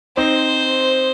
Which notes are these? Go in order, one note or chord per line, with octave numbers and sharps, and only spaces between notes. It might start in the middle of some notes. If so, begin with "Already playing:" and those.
C4 D#4 C5